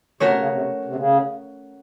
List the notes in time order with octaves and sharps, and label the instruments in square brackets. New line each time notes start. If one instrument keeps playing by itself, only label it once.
[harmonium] C3 [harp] A3 C#4 F#4 A#4 C#5
[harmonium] C#3
C3
C3
C#3